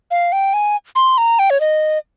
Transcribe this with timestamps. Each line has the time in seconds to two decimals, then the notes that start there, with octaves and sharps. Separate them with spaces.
0.11 F5
0.32 G5
0.54 G#5
0.96 C6
1.18 A#5
1.39 G5
1.50 C#5
1.60 D#5